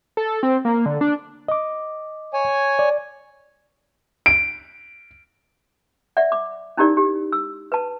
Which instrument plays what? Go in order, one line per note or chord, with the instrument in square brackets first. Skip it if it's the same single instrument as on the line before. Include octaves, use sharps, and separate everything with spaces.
[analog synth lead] A4
C4
A#3
D3
D4
[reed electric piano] D#5 D6
[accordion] C#5 G#5
[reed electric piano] D5
[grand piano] D7
[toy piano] D5 E5 F#5
D6
C#4 D#4 E4 G4 A#4 D5
G4
E6
B4 A5